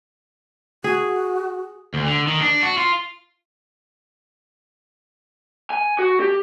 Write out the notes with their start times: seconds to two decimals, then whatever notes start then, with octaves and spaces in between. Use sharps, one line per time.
0.84 F#4 G#4
1.94 D2
2.06 D3
2.27 D#3
2.41 D4
2.63 F#4
2.78 F4
5.70 G#5
5.99 F#4
6.20 G4